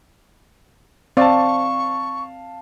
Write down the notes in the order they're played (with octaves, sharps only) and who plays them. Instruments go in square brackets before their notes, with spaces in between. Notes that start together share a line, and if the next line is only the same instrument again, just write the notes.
[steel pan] C4 D5 [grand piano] F5 A5 [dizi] C#6